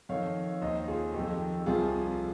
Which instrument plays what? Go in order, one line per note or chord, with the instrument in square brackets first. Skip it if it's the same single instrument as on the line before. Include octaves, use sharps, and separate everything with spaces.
[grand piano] F2 D#3 C#5 F5
D#2 D#3 C5 D#5
F4 G#4
F2 D#3 G4
C2 C3 F3 F4 G#4